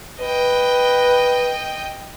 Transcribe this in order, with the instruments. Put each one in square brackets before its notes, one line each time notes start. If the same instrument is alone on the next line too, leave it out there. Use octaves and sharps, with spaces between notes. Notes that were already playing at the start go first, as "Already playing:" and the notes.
[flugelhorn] B4 [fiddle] D#5 G5